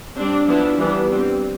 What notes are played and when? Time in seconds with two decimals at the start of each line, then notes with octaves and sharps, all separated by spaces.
0.17 G3 C4 D4
0.47 F3 B3 D4 E4
0.79 E3 G3 B3 D4
1.10 G3 C4